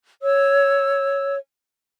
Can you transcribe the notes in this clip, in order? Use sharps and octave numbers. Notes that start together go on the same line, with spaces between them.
C#5 E6